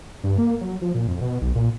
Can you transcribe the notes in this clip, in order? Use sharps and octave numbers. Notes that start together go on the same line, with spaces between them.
G2
A#3
F#3
F3
A#2
F2
B2
B1
A#2